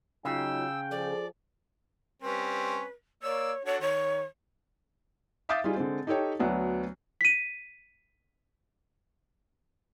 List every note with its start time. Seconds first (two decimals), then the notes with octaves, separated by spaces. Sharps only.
0.25 C#3 F#3 D#4 F4 G5 E6
0.91 F3 G#4 A4 D5
2.22 G3 C4 C#4 B4
3.23 A#3 C#5 D5 E6
3.65 D4 F#4 A4 C#5
3.81 D#3 C#5
5.49 E5 F5 D6 D#6 G6 A6
5.64 G3 D#4 F4 G#4
5.76 D3 G#3 C4
6.07 D#4 G4 A4 C#5 G5
6.39 D2 F#3 B3 D4
7.21 B6 D#7